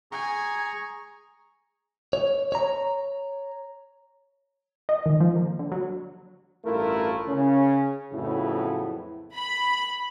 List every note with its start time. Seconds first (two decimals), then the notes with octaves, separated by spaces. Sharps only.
0.12 G#4 G#5 A#5 C#6
2.13 C#5
2.52 C#5 A#5
4.89 D#5
5.06 D#3
5.20 F3
5.36 A#3
5.59 D3
5.72 F#3
6.65 A1 G2 A3 E4 F4 A#4
7.28 C#3 C#4
8.12 F2 A2 C#3 F#3 B3 E4
9.33 B5